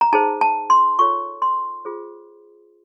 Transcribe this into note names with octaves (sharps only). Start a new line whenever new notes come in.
A#5
D#4 G#4 C5 A5
A5
C6
F4 A4 C#5 C#6
C6
F4 G#4 C5